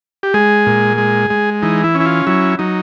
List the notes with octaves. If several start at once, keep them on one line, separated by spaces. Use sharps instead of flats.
G4
G#3 G#4
A#2
G#3
G#3
E3 D#4
E4
C#4
E4
F4
F#3 E4
F#3 D#4